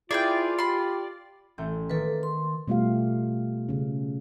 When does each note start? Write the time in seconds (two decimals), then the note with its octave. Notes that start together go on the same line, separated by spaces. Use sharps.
0.11 E4 F4 G#4 B4 D5 G5
0.58 G4 B5 C6
1.58 A1 A3 G6
1.90 D#3 A#3 A4 B4 C#6
2.23 C6
2.68 B2 G3 A3 F4 G4 F5
3.69 C#3 C#4